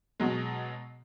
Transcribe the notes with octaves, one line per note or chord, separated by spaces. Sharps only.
B2 F#3 G#3